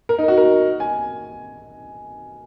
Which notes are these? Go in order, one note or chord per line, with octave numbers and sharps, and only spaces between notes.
A#4
D#4
F#4
A#4
G#5